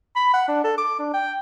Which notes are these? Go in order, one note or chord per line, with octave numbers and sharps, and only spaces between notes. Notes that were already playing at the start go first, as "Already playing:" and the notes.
B5
F#5
D4
A4
D6
D4
G5